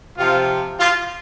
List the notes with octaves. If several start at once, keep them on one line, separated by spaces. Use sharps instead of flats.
C3 F3 F4
F4